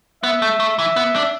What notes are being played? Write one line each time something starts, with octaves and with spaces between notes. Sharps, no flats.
B3 E5
A3
A3
E3 E5
B3
D4